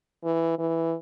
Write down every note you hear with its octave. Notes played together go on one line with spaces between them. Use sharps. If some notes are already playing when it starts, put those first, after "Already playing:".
E3
E3